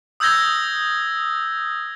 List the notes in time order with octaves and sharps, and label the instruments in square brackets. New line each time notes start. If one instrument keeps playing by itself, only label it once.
[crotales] D#6 E6 G6 G#6 A#6 G7